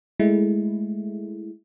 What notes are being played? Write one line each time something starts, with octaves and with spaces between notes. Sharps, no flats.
G#3 A3 E4